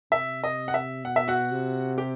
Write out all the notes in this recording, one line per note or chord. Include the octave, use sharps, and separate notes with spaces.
C3 E5
D#5
F#5
E5
B2 F#5
E5
F#4 F#5
C3
G4 G5